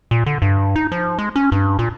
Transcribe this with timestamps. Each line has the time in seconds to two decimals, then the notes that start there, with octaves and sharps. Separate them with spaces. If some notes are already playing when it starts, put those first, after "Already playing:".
0.11 A#2
0.26 D3
0.42 G2
0.76 D#4
0.92 F3
1.19 G#3
1.36 C#4
1.52 G2
1.79 A#2